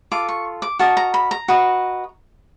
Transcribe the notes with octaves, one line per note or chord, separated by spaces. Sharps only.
F4 A4 D6
C#6
D6
F#4 A#4 D#5 A5
A#5
B5
A#5
F#4 B4 D#5